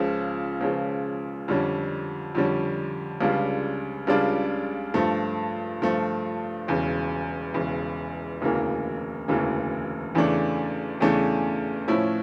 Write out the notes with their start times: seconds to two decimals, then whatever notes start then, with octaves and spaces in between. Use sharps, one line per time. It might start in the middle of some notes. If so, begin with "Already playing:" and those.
Already playing: C#2 C#3 F3
0.61 C#2 C#3 F3
1.48 F2 D3 G3 C#4
2.35 F2 D3 G3 C#4
3.21 C#2 C#3 G3 D4 F4
4.07 C#2 C#3 G3 D4 F4
4.94 G2 F3 A3
5.82 G2 F3 A3
6.68 E1 E2 C#3
7.54 E1 E2 C#3
8.41 E1 D2 C#3 E3 A#3
9.28 E1 D2 C#3 E3 A#3
10.15 E2 C#3 E3 A3 D4
11.01 E2 C#3 E3 A3 D4
11.88 A2 F3 C#4 E4